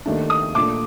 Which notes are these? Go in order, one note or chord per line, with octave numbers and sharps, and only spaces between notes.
D#2 D#3 A3 D4
D#6
A#2 A3 D4 D6